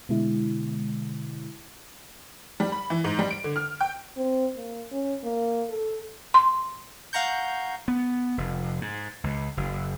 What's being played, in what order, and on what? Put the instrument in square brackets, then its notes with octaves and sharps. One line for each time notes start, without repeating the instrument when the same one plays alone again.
[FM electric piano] B2 D3 G#3 E4
[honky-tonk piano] G3
B5
E3
G#2
G3
D7
D3
F6
G5
[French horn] C4
A#3
C#4
A#3
A4
[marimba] C6
[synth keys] F5 F#5 A#5 C#6 G6
[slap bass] B3
F1
G#2
C#2
F#1